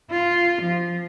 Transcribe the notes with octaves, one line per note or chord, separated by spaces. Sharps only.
F4
F3